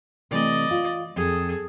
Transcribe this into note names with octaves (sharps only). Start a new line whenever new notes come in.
C3 E3 A3 D5 D#5
F4
F2 G#4 A4